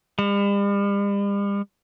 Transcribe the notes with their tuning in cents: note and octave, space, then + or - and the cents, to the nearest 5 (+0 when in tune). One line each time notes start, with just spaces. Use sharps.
G3 +45